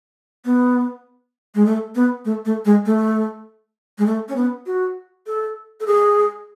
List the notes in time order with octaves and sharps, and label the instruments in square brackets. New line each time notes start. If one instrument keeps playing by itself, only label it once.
[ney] B3
G#3
A3
B3
A3
A3
G#3
A3
G#3
A3
C#4
B3
F#4
A4
A4
G#4